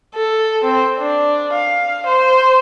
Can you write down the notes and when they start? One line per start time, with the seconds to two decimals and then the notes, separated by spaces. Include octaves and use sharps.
0.15 A4
0.64 C4
0.98 D4
1.53 F5
2.07 C5